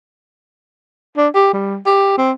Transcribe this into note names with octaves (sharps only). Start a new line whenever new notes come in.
D4
G4
G3
G4
C4